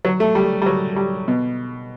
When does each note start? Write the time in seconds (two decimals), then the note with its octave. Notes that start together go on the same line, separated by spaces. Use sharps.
0.05 F#3
0.20 A3
0.35 G3
0.62 G3
0.66 F#3
0.96 G3
1.28 B2